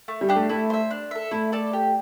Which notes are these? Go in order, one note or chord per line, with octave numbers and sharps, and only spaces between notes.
A3
G3
D4 G4
A3
A3 E4
C5 E5
D4
A4 E5
A3 E4
A4 D5 A5
G4